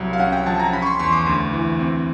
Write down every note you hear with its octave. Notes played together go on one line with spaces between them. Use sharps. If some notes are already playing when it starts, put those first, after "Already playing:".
Already playing: C2 F#3
F5
C#4 F#5
G5
F3 A5
A#5
C#4 B5
C#6
C6
E2 C6
D6
D2
E3
C4